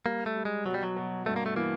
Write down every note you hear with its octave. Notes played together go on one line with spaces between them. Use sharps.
G3 A#3
A3
G3
G#3
B2 F#3
G3
F#3
B2
G2 A3
A#3
A3
E3 A#3